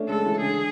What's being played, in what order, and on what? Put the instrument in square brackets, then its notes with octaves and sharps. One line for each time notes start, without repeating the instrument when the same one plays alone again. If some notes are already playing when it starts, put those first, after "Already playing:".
Already playing: [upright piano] A3 C#4 D4
[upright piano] G#3 [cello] A4
[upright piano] E3
[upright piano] D3 [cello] G#4